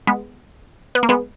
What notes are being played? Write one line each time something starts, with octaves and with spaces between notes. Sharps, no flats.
G#3 B3
B3
A#3
G#3 B3